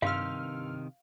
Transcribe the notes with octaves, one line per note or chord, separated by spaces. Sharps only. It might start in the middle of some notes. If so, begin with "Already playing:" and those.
G2 C3 D#3 G4 F5 C6 E6 F6